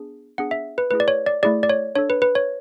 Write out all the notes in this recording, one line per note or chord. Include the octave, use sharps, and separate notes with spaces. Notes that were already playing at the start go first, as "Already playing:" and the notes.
Already playing: B3 D4 G#4
B3 D4 G#4 F#5
E5
B4
A3 E4 G#4 B4
D5
C#5
D5
A3 E4 G#4 D5
D5
C#5
D4 A4 C#5
B4
B4
C#5